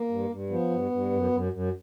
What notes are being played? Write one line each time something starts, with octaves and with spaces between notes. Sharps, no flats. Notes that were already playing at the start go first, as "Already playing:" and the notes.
Already playing: A#3
G2
G2
F3 B3
G2
G2
F#2
F#2
F#2